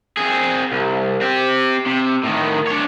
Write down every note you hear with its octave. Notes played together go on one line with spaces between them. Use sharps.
C4 G#4
C2
C4 G4
C3
A2 D#3
D4 C#5